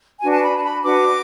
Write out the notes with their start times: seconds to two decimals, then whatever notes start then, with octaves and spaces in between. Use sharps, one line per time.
0.20 D4 F#4 B4 G#5
0.31 A5
0.43 B5
0.57 A5
0.63 B5
0.83 D4 F#4 B4 D6